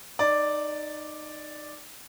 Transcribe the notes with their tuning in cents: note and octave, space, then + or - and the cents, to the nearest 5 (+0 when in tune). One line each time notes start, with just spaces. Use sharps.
D#4 -20 D5 +0